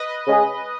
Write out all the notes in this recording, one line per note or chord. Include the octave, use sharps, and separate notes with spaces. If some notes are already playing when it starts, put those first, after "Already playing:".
Already playing: B4 D#5
C#3 G#3 C#4 G#4